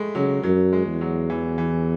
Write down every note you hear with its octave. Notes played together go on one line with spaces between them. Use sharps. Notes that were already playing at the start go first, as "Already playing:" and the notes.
Already playing: A2 G#3 A3
C#3 F#3
F#2 F#3
G#3
E2
F#3
E3
E3